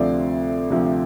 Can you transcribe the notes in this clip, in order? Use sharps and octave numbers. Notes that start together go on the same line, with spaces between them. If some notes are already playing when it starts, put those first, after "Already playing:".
Already playing: D2 C3 F3 C4 D5
D2 C3 F3 C4